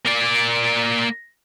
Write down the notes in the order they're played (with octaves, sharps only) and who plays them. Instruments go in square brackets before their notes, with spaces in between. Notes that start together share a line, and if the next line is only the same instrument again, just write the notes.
[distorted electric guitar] A#3 D5